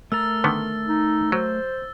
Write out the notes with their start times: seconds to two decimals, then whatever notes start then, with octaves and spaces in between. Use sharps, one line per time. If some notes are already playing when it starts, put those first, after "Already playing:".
0.12 A3 A#4 A#5 E6 A6
0.44 D3 D#3 B3
0.88 D#4
1.32 F#3 C5